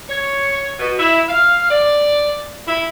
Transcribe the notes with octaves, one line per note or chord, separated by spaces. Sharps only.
C#5
B2
E4
F5
D5
E4